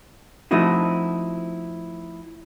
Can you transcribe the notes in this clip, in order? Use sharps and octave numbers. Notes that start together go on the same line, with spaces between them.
F3 A3 C4 D#4 E4 F#4